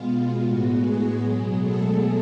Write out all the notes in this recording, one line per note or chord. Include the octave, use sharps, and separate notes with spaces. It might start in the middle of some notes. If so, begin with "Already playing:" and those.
Already playing: B2 G#3 B3 F4
A2 G#3 B3 F#4
G#3 G#4
B2 F#3 B3
A3 A4